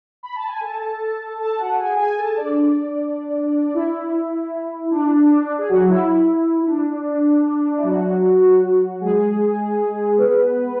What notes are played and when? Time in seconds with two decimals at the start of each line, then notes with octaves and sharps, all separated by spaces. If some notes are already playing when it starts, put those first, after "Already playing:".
0.23 B5
0.36 A5
0.48 G#5
0.61 A4 A5
1.40 A4 A5
1.59 F#4 F#5
1.79 G#4 G#5
1.99 G#4 G#5
2.18 A4 A5
2.37 D4 D5
3.74 E4
4.91 D4
5.58 G#4
5.68 F#3 F#4
5.88 E4
6.62 E4
6.67 D4
7.77 E4
7.83 F#3 F#4
9.01 G#3 G#4
10.18 B3 B4